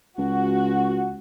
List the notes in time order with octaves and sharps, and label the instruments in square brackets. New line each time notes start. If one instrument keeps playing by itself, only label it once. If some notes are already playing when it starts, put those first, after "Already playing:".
[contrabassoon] C#2 [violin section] F#4